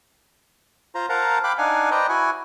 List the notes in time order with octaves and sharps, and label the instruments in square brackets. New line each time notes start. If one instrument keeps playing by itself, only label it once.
[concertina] F4 C5 A#5
A#4 C5 F5 F#5 A5 A#5
F5 G5 B5 D6 F#6
D4 D#4 F5 F#5 G#5
B4 C5 D5 D#5 G5 A#5
E4 F#4 F#5 G#5